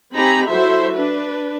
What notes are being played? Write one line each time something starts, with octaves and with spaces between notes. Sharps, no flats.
C4 D#4 G4 G#5 A#5 B5
F#3 E4 F#4 A4 C5 E5
D4 B4